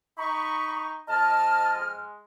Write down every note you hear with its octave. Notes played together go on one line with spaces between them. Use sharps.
D#4 A#5 B5 C#6
F2 D#5 A5 F6
G#3